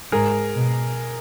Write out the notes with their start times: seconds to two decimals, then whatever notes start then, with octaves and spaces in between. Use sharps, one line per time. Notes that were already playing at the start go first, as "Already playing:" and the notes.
0.12 G#2 G#4 A#4
0.55 B2